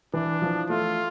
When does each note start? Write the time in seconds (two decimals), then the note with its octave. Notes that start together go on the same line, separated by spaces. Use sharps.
0.14 E3 D4
0.42 F3
0.69 A3 F4